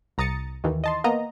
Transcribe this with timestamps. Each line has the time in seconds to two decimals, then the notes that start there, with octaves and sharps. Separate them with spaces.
0.18 C2 A#5 D#6 A6 C#7
0.64 D#2 D#3 E3
0.84 D#5 A5 C6
1.04 A#3 B3 D#5 A#5